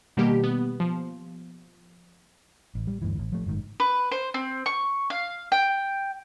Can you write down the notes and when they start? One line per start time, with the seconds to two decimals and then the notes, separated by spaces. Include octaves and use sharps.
0.17 B2 D#3 G3 A#3 G4
0.44 B3
0.80 F3
2.75 A1
2.87 G3
3.02 D2 G2 E3
3.19 A1
3.32 F3 A3
3.46 F#1 G#2 D#3
3.80 B4
4.12 C5
4.34 C4
4.66 C#6
5.10 F5
5.52 G5